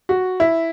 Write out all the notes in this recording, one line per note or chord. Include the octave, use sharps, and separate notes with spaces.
F#4
E4